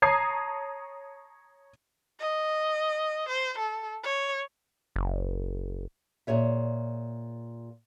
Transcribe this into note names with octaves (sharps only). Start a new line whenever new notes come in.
C#5 A5 A#5 D#6 G#6 C7
D#5
C5
A4
C#5
F#1
A#2 G#4 C#5 E5